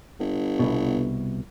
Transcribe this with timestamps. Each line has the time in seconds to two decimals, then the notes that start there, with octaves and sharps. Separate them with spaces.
0.20 G1
0.59 C2 B2